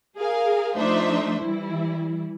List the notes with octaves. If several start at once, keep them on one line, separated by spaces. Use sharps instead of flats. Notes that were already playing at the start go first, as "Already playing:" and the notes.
G#4 A#4 F5
F3 A3 D4 D#4 C5 E5
E3 G3 E4